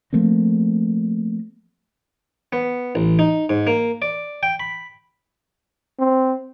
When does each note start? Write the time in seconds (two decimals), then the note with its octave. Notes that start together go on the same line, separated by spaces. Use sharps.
0.13 F3 A3 A#3 C4
2.53 B3
2.95 A1
3.19 D#4
3.49 G#2
3.67 A#3
4.02 D5
4.43 G5
4.60 B5
5.99 C4